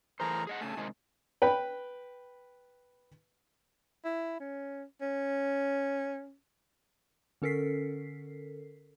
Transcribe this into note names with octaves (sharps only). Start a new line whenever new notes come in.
A2 E3 G#4 A#4 C5 A#5
G#4 D#5 F#5
C#3 A3 G#5 A5
C3 D#3 G#3
B4 G5 B5
E4
C#4
C#4
D3 C#4 A4 A#4 B6 C7